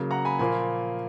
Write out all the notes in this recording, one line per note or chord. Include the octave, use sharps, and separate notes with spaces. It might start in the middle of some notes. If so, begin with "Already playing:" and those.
Already playing: C#3 F#3 A#3
F#5 A#5
G#5 B5
A#2 F3 A#3 G#5 B5